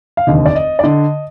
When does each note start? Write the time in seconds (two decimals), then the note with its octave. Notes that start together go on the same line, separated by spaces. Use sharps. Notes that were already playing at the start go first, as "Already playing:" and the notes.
0.17 F5
0.27 F1 D#2 D3 D#5
0.46 D5
0.55 D#5
0.79 D5
0.83 D3 D#5